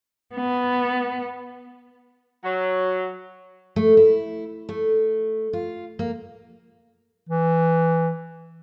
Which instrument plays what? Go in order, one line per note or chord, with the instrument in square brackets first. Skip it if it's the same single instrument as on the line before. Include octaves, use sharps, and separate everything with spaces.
[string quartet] B3
[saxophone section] F#3
[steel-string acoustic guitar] A3
E4
A3
F4
A#3
[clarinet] E3